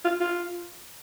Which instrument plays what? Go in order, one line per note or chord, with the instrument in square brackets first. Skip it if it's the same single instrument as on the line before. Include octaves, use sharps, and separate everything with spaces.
[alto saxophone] F4
F4